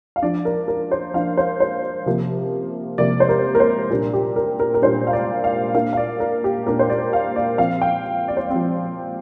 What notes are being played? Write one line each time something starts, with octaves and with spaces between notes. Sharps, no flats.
F5
F3 D4 D5
A#4
A#4
C5
F3 D4 F5
C5
C5
C3 F3 A#3
C3 F3 A#3 D5
C5
A#4
A#4
C5
A#2 G3 D4 A#4
G4
A#4
A#4
A#4
A#2 G3 D4 C5
F5
D5
F5
A#2 A#3 D4 F5
F5
D5
A#4
G4
A#2 A#3 D4 A#4
C5
D5
F5
D5
F3 C4 F5
G5
D5
C5
C4 D5
F3